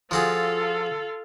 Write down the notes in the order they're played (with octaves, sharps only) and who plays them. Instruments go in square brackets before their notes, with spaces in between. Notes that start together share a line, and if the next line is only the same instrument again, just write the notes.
[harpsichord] F3 F#4 G#4 [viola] F4 A4